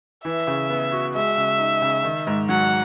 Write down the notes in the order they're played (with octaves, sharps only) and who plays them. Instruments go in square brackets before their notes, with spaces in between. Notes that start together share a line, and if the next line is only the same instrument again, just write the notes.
[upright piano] E3 [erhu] E5
[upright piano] C#3
B3
F#4
[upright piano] G#3 [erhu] E5
[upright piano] C#3
D#4
C#3
D#3
G#2
[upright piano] F#3 [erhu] F#5